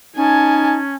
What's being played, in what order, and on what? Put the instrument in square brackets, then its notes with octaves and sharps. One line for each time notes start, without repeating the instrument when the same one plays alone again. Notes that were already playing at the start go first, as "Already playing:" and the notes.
[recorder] C#4 [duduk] D#4 [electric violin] G#5 A5